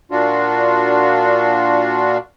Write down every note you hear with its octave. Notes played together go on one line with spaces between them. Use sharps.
A#2 D4 F4 F#4